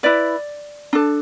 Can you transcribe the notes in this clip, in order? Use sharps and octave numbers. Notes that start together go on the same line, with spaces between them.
E4 B4 D5
D4 A4